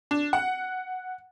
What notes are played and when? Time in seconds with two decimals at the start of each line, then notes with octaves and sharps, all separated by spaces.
0.11 D4
0.33 F#5